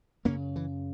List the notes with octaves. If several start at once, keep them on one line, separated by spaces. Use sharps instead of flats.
F#2 C#3 A#3 C#4
E3